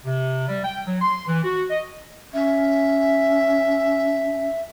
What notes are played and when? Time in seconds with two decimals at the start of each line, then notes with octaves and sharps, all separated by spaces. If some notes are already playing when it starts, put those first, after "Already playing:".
0.05 C3
0.48 G3
0.64 G5
0.86 F#3
1.01 C6
1.27 E3
1.44 F#4
1.70 D#5
2.34 C#4 E5